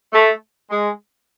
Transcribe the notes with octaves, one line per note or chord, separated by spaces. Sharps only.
A3
G#3